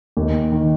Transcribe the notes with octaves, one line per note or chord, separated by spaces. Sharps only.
D#2
D#3